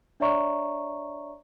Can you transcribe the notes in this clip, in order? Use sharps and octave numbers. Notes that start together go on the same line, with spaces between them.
D4 C#5 D5 E5 A#5 C#6